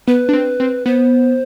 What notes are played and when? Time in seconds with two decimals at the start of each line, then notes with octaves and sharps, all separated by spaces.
0.08 B3 B4
0.29 D4
0.33 C4
0.60 C4
0.86 B3 C5